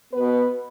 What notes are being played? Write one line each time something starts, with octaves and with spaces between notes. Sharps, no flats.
B2 B3 B4